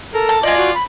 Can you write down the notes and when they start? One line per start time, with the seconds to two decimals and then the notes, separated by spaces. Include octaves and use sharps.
0.13 A4 A#4
0.29 A5
0.43 F4 D5 D#5 G#5
0.57 F#4
0.74 B5